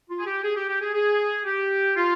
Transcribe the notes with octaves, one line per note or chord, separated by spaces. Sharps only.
F4
G#4
G4
G#4
G4
G4
G#4
G#4
G4
F4